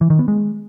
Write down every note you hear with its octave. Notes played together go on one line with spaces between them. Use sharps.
E3
D#3
B3
G#3